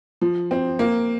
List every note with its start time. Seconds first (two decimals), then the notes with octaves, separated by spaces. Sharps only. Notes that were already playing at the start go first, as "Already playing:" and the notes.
0.21 F3
0.51 C4
0.79 A#3